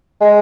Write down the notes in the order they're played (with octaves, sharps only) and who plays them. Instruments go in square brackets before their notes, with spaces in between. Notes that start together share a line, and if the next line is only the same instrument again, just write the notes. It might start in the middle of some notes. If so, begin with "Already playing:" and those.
[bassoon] G#3